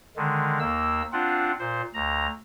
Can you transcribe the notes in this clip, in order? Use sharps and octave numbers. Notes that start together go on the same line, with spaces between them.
D3 D#3 G#3
D#2 A#3 E6
C4 D4 F4 F#5
A#2 C5
D2 A#5